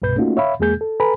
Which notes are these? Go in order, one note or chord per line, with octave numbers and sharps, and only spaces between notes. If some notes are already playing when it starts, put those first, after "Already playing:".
C2 G2 B2 B4 G6
A3 A#3 C#4 D#4 F4 F#4
C#5 E5 F5 B5
E2 G#3 A#3 G#4 G6
A4
A4 B4 G#5 A#5 B5